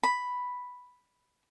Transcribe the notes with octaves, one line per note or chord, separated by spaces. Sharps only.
B5